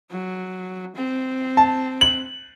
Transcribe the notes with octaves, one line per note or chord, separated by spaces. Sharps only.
F#3
C4
A5
F#7